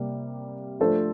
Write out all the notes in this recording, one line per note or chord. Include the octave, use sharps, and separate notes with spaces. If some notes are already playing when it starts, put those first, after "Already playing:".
Already playing: C3 G3 A#3
F3 A3 D4 A4 C5